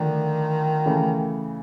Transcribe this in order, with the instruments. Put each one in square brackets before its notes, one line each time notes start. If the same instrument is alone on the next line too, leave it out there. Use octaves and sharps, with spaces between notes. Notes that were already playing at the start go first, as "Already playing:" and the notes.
Already playing: [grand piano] D3 F3 A3 D4 [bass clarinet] D#3
[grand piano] C#3 E3 A3